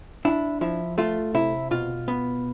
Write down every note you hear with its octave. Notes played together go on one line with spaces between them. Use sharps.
D4 E4
F3 E4
A3 F4
C3 E4
B2 F4
B3